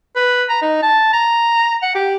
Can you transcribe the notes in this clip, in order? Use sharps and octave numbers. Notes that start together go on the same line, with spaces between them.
B4
A#5
D#4
A5
A#5
F#5
G4